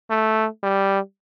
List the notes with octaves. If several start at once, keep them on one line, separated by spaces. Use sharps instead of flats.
A3
G3